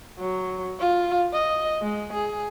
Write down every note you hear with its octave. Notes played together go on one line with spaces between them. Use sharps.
F#3
F4
D#5
G#3
G#4